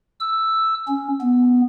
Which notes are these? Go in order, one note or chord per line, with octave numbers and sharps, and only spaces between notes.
E6
C#4
B3